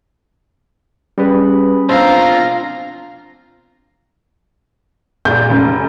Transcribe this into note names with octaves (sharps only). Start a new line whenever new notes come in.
G3 C#4 G#4 B4 B5
B2 C4 D4 F4 C5 F5 A#5 E6
A#2 G#3 D5 G6
F1 C#3